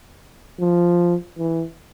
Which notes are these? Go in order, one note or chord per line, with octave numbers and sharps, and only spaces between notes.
F3
E3